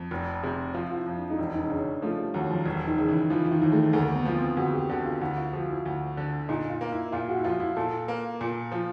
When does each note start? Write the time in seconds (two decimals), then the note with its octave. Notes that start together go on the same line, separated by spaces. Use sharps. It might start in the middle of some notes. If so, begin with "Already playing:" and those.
Already playing: F2
0.11 F1
0.43 C3
0.74 F3 F4
0.90 F4
0.96 E4
1.06 F2
1.17 D4
1.30 D#4
1.38 E1 D4
1.54 D#4
1.64 C#4
1.70 C#3 D4
1.86 C#4
2.02 F3 A3
2.18 G3
2.34 D#2 F#3
2.50 F3
2.66 E1
2.88 D#3
2.98 C#3
3.08 E3
3.30 E3 F3
3.45 E3
3.51 D#3
3.62 D#2
3.72 A3
3.93 D2 A#3
4.15 B3
4.25 F3 B3
4.36 C4
4.57 D2 F#4
4.73 G4
4.89 D3 F#4
5.05 F4
5.21 D2 E4
5.37 F4
5.53 F3 F#4
5.69 E4
5.86 D2
6.17 D3
6.49 A#2 D#4
6.70 F4
6.81 A#3
6.92 E4
7.12 A#2 F4
7.29 F#4
7.37 E4
7.44 F3 F4
7.60 E4
7.76 A#2 A4
8.08 A#3
8.41 A#2
8.72 F3